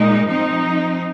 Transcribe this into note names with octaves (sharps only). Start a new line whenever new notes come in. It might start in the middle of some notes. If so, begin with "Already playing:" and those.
Already playing: A#2 G#3 D#4
F3 C4 D#4